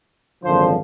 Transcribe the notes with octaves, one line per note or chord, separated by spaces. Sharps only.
G#1 F#2 D3 F3 C5